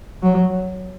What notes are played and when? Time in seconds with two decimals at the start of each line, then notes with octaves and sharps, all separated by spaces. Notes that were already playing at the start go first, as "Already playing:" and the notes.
0.23 F#3